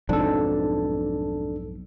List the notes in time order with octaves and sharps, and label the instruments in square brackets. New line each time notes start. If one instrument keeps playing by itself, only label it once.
[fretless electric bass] B1 F2 G#2 [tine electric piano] D4 A4